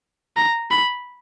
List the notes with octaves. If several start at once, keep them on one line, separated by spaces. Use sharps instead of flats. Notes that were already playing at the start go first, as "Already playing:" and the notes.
A#5
B5